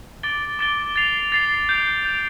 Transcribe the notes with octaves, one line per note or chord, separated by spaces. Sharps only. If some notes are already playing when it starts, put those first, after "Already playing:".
D6 A6 D7 G7
D6 A6 D7 G7
A6 C7 F7
A6 C7 F7
G6 D7 F7
G6 D7 F7